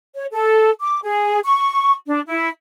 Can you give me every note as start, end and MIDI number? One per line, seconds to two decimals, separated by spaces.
0.15 0.25 73
0.31 0.70 69
0.80 0.99 86
1.03 1.40 68
1.44 1.91 85
2.06 2.21 62
2.27 2.47 64